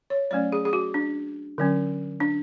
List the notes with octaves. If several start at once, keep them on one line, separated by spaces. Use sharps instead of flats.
C#5
F#3 A3 C#4 D5
G#4
G#4
F#4
D4
D3 F#3 C#4
D4